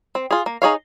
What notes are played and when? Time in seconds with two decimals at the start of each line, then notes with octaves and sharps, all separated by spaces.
0.15 C4
0.31 F4 G#4
0.46 A#3
0.62 D#4 G#4 C#5 F5